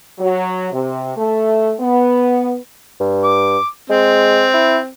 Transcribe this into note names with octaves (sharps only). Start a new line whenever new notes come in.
F#3
C3
A3
B3
G2
D6
G#3 C4
E4